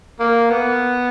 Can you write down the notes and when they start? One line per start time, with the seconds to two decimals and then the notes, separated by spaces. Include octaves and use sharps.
0.20 A#3
0.50 B3